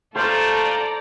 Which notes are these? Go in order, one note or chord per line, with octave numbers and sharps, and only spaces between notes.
A3 F4 A4 C5 D5 A#5